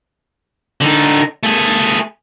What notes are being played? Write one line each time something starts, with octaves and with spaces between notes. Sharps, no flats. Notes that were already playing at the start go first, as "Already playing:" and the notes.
D3 D#4
A3 G#4